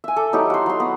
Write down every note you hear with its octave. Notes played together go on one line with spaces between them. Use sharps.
E5 G#5
A4 D6
F#3 D#4 E4 G4
F#4 C6
F#3 C6
B3